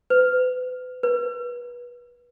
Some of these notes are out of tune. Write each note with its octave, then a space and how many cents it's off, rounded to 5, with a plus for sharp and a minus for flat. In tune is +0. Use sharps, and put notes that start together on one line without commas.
B4 +35
B4 -25